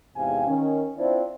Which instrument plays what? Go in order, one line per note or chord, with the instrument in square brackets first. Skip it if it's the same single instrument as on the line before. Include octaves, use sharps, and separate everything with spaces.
[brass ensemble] E2 G#2 C3 G4 F5 G#5
D#3 C#4
C4 D4 E4 F4 C5 D5